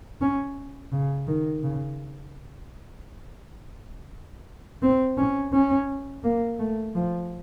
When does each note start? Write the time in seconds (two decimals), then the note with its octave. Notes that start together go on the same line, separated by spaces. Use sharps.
0.21 C#4
0.92 C#3
1.27 D#3
1.63 C#3
4.82 C4
5.18 C#4
5.53 C#4
6.23 A#3
6.59 A3
6.95 F3